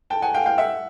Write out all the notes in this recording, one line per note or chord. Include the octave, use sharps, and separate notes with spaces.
G5 A5
F#5 G#5
F5 G5
F5 G5
E5 F#5